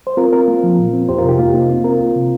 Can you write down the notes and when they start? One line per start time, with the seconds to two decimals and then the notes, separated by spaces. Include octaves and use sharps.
0.07 C5
0.17 C4 F4 A#4
0.33 C4 F4 A#4
0.48 A#3
0.63 F3
0.79 A#2
0.93 C4
1.09 F2 G4 C5
1.19 F4 A#4
1.24 C3 D#4 G4
1.39 A#3 F4
1.54 A#3 D#4
1.69 C4 F4
1.84 C4 F4 A#4
2.00 C2
2.15 C3